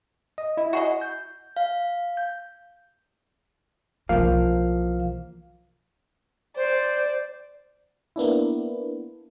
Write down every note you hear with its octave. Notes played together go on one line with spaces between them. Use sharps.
D#5
E4
F#4 G#4 D#5
G6
F5
G6
B1 E3 F3 A#3 F5
C5 D5
A#3 B3 D4 E4